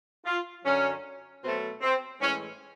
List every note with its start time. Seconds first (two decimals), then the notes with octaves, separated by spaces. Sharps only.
0.26 F4
0.64 F#2 D3 F#3 C#4
1.42 B2 F#3 A3 C4
1.81 C4
2.20 A2 E3 G#3 C#4